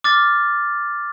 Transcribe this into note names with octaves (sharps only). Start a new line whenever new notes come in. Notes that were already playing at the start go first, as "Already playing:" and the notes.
D6 F6 A6